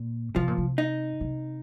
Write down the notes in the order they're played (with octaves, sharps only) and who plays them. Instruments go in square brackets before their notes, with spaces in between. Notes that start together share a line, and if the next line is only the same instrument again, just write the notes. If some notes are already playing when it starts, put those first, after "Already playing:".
Already playing: [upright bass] A#2
[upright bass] C3 [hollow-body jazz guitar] F3
[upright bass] A#2
C3
[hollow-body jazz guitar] D#4
[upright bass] C3